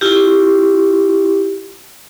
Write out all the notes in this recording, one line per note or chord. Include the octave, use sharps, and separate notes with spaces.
E4 F4 G4